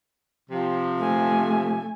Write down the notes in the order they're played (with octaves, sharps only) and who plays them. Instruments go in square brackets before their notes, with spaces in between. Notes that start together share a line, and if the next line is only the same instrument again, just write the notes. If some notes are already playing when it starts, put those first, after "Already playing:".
[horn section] C3 F3
[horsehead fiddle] A3 G#5